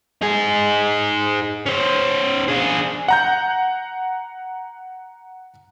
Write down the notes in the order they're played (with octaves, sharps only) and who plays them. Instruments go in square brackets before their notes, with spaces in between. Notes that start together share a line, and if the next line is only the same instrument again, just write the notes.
[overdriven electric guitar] D#4 G#4
C#4 C5
D4 G#4
[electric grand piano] F#5 A#5 G6